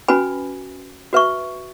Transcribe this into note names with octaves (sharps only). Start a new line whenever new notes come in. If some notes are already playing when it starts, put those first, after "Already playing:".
C#4 F#4 B4 G#5 B5
F#4 B4 E5 C#6